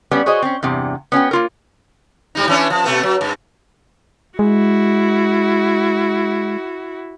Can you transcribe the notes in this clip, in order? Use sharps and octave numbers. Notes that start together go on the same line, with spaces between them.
G3 B3 C#4
F#4 G#4 C5 C#5 D#5
C4 C#4
E2 G2 C3
B3 C#4 F#4 G5
A#3 F4 A#4
G#2 G3 D#4
E3 C#4 D4
F3
B2 A3 B3
F#3
G2
G#3 E4 F#4